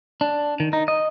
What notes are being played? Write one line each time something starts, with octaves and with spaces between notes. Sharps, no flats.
D4
D#3
D#4
D#5